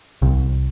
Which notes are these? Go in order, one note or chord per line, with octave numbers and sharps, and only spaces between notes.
C2